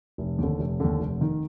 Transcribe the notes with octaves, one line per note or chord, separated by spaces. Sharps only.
F1
D#2 D3
F1
D#2 D3
F1
D#3